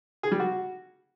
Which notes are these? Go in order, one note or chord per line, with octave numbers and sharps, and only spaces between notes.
G#4
G3
F#4